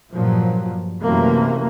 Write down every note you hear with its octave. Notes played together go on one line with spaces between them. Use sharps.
G2 A#2 F3 F#3
F#2 C3 E3 A3 A#3